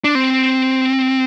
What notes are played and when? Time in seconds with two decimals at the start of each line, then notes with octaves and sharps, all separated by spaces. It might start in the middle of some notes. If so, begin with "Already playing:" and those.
0.04 D4
0.15 C4